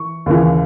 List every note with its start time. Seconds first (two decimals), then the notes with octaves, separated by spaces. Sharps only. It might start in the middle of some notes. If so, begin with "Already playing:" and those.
Already playing: E3 C#6
0.26 D#2 C#3 E3